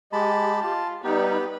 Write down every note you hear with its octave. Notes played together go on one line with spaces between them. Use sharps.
G#3 G4 D#5 A5 B5
F4 A5
G3 B3 D#4 G4 B4